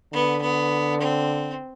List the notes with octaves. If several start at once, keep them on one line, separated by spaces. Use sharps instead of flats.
D3 B3
B3
C4